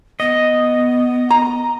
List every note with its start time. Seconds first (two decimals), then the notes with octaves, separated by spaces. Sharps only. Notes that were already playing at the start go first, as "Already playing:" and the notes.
0.20 B3 D#5
1.31 A#5